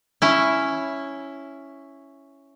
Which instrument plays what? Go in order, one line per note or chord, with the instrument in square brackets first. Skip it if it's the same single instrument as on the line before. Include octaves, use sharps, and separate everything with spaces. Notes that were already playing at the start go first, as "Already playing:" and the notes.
[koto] C#4 E4